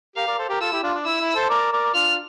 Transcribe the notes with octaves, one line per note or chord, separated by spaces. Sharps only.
G4 A#4 F5
A#4 D5
A4 C5
G4 A#4
F4 A4 E6
E4 G4
D4 F4
D4
E4 E6
E4
A4 C5
A#4 D5
A#4 D5
D4 F4 F6